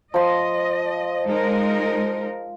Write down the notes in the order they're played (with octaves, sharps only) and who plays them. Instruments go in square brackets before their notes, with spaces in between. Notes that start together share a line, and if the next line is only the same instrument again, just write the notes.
[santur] F3 C6 [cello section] D#5
[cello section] G#3 D#4 A#4